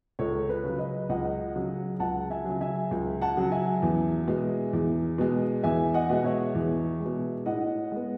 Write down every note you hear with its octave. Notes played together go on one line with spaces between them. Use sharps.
C#2 A4 C#5
B4
C#3 F#3
B4 D#5
C#2 D#5 F#5
C#3 F#3
C#2 F#5 A5
E5 G#5
C#3 F#3
E5 G#5
C#2
F#5 A5
C#3 F#3
E5 G#5
E2
B2 G#3
E2
B2 G#3
E2 E5 G#5
D#5 F#5
B2 G#3
C#5 E5
E2
B2 G#3
A2 D#5 F#5
G#3 B3